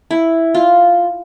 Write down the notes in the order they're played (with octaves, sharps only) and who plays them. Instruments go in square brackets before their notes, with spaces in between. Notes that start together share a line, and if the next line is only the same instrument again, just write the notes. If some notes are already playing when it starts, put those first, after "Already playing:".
[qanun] E4
F4